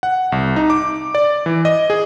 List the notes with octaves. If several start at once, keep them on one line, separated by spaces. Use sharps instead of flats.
F#5
C2
D#4
D6
D5
E3
D#5
G#4